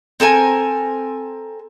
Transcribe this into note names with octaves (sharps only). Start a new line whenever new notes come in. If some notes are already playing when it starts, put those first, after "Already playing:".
C4 A4 A#4 G#5